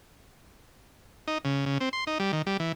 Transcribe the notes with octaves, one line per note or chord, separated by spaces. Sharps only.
D#4
C#3
C#3
C4
C6
D#4
G3
D#3
G3
E3